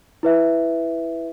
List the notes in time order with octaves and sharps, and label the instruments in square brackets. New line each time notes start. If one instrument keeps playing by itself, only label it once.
[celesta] E4 B4 E5